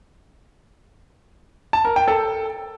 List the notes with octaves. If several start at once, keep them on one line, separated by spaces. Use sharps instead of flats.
A5
A#4
G5
A4